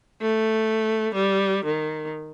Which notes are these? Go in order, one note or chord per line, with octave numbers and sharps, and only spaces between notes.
A3
G3
D#3